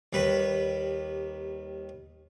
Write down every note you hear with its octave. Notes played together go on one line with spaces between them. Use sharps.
D#2 G3 B4 B5